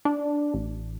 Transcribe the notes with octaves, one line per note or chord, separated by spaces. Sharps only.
D4
A1